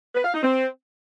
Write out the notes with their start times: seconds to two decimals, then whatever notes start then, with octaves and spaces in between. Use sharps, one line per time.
0.14 B4
0.24 F5
0.33 D#4
0.43 C4